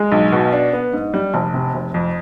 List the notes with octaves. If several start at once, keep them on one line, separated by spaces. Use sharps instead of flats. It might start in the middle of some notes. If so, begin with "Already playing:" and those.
Already playing: G#3
B1
B2
D4
B3
G#2
G3
F1
C3
F1
F2